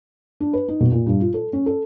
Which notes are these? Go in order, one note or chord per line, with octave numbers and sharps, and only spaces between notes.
D4
B4
D#4
B2
A#2
G2
F4
A4
C#4
A4